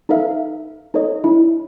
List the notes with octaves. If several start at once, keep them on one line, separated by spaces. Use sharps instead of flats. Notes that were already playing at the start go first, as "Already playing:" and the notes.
D#4 A4 B4 E5 F5
D#4 A4 B4 C#5 D#5
D4 E4